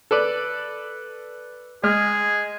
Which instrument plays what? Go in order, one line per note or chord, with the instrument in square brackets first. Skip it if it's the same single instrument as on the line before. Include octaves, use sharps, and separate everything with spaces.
[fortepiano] A4 B4 D5
[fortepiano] G#3 F6 [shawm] G#4